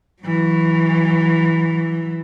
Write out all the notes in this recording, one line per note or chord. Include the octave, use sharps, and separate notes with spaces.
E3 F#3